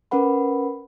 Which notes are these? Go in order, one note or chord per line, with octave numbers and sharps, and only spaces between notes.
C#4 A#4 B4 F#5 B5